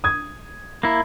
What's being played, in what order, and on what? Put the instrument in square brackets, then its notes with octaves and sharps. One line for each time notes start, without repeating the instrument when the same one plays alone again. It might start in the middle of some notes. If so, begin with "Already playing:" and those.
[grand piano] D#6 G#6
[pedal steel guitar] A#3 E4